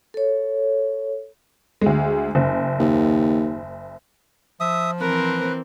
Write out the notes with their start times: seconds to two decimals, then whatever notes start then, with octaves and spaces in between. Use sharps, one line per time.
0.14 A4 C#5
1.81 D2 G#3
2.35 F#1
2.79 D#2
4.60 F3 E5 D#6
5.01 E3 C4 A#4 B4